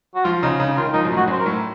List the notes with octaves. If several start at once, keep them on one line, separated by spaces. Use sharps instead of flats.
F#4
F3 F4
C#3 D#4
C#3 D#4
D#3 F4
D#3
F3 D#4
F#2
A2
F#4
F#2 C5
A#4
A2